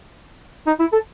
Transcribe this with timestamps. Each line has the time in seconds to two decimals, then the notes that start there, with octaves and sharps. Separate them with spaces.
0.67 D#4
0.80 E4
0.93 A4